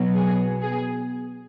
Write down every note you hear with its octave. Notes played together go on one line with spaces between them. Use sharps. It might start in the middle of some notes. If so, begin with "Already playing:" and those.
Already playing: B2 F#3 B3
G#4
G#4